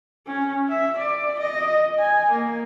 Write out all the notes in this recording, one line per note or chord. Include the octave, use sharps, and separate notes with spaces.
C#4
E5
D5
D#5
G#5
A#3